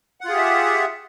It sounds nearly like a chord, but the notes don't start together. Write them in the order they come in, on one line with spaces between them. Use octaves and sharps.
F#5 F4 G#4 G4 E5